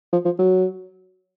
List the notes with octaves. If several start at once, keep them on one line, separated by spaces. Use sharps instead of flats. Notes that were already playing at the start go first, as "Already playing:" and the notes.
F3
F3
F#3